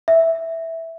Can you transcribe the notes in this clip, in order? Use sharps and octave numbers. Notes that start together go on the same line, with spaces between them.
E5